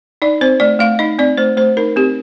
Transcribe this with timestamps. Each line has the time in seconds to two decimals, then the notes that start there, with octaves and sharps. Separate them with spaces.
0.22 D#4 D5
0.41 C4 C5
0.60 A3 D5
0.79 A3 F5
0.99 D#4 D#5
1.19 C4 D5
1.37 A3 C5
1.57 A3 C5
1.77 D#4 A#4
1.96 C4 G4